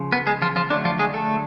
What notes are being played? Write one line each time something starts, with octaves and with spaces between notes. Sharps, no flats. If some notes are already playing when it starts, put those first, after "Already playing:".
Already playing: C#3 F3
B3 B4
G#3 G#4
F3 F4
F3 F4
D3 F#3 A3 D4
F3 F4
G#3 G#4
A3 A4